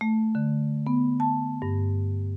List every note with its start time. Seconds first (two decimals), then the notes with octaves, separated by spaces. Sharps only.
0.01 A3
0.35 D3
0.87 B3
1.20 A5
1.62 G2